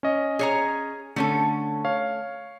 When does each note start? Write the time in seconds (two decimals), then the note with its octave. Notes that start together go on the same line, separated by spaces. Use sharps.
0.03 C#4 D#5
0.39 G#4 C#5 A#5
1.16 D3 A3 C#4 A4
1.85 C#5 F5